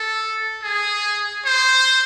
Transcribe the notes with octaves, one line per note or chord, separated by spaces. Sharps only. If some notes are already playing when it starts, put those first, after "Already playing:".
Already playing: A4
G#4
C5